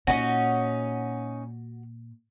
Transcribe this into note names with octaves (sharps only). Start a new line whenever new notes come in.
A#2 C#4 D#4 F#4